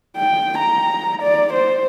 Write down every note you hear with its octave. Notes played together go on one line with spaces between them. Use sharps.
G5
A#5
D5
C5